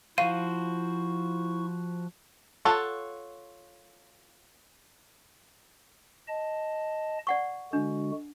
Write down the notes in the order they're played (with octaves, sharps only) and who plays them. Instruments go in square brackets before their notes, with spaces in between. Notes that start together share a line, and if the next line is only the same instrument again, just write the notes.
[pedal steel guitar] F3 F#4 C5 [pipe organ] E4 C#6 [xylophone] F5 D#7
[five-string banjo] F4 A4 C#5 F#5
[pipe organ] D#5 A5
[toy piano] D5 F#5 C#6
[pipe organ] D3 G#3 F#4 [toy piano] D4